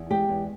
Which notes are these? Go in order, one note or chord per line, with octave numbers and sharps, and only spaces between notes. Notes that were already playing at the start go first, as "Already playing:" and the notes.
Already playing: E2
G#3 G4 G5
E2